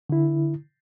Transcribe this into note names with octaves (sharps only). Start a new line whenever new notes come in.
D3 E4